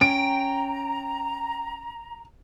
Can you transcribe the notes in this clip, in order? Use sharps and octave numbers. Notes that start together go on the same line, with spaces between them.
C#4 G5 A#5 D7